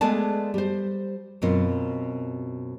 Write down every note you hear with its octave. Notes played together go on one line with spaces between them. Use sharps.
G#3 A3 B3 G#4 D5 A5
G3 C5
F#2 B2 C4 F4